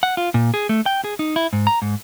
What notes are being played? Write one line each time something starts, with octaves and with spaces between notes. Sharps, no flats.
F#5
F4
A#2
G#4
A3
G5
G#4
D#4
E4
G#2
A#5
G#2